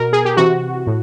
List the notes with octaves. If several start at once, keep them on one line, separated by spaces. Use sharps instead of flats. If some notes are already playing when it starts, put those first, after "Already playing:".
Already playing: B2 A#4
G#4
G4
C3 E3 F#4
A2